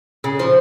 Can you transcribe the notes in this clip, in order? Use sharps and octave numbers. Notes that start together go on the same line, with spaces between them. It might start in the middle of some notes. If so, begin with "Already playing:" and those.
C#3
F3